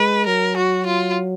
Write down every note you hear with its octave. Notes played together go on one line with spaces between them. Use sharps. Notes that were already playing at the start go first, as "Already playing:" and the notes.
Already playing: G#3 B4
F#3 A#4
F#4
F4